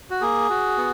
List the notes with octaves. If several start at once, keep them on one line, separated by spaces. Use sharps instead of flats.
F#4
A#3 G#4
F#4
B3